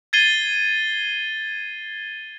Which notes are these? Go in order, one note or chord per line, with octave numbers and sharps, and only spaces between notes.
G#6 A6 C7 D#7 G7